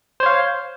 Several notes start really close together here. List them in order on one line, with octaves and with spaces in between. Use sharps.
C5 C#5 F5